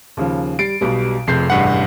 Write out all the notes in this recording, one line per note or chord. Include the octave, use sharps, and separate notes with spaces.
D#2 C#3 F3
G3 A6 C7 D7
B1 B2 G3
F1 F2 G#4 G6 C7
A1 G2 F#5